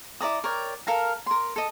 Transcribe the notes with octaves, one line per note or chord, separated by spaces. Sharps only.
E4 D5 A#5 D#6
A#4 C#5 D5 G5
A4 A#4 F5 A#5
A#4 C6
A4 D#5